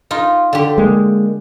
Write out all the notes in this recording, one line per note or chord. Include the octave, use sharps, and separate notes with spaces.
D#4 F4
D3 G4
G#3 A#3